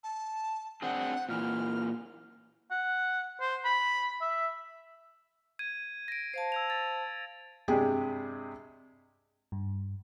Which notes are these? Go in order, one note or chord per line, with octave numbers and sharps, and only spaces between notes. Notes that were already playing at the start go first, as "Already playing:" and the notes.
A5
C4 D4 G#4 F#5
A#2 E3 F6
F#5
C5
B5
E5
G#6 D#7
A#6 D7
C5 F5 A5
E6 G#6 F7
A6
G2 C3 G#3 D4 G4 G#4
G2